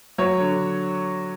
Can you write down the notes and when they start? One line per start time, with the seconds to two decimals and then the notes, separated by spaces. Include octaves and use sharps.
0.18 F#3 C#5
0.40 D3